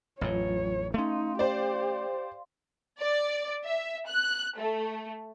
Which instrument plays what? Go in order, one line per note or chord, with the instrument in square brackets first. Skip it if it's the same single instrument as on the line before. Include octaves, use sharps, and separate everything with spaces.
[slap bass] A1 F2 A2 [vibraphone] F#3 F4 [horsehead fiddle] C#5
[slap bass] A3 C#4 [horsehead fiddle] D#4 [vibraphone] F5 C6
[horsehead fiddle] G4 [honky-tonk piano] C5 D5
[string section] D5
E5
F#6
A3